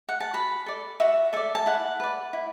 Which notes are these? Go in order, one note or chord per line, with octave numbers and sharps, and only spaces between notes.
F#5
A5
F#4 B5
A4 D5
F#4 E5
A4 D5 E5
A5
E4 F#5
B4 D5
E4